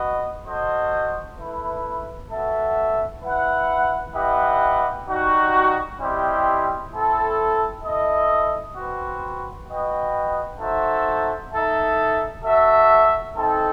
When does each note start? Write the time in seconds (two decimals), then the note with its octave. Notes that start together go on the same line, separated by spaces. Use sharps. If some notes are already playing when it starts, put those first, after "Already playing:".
Already playing: F#4 B4 D#5
0.45 F#4 A4 C5 D#5
1.38 A3 E4 B4
2.31 B3 F#4 A4 E5
3.23 E4 B4 F#5
4.14 E4 G4 B4 D#5 F#5
5.07 G3 D#4 F#4
5.99 G3 C4 E4 G4 D#5
6.91 C4 E4 A4
7.83 E4 A4 D#5
8.76 C4 F#4 B4
9.68 F#4 B4 D#5 G5
10.59 D#4 F#4 A4 C5 E5
11.52 D#4 A4 E5
12.45 F#4 A4 E5
13.36 C4 D#4 A4